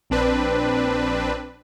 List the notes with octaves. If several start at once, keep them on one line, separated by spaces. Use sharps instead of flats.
A#1 C4 D4 B4